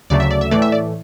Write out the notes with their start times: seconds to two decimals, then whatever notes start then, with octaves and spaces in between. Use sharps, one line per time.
0.10 D2 C#3 F#3 A3 D5
0.20 E5
0.31 D5
0.41 E5
0.51 A2 E3 A3 D5
0.62 E5
0.72 D5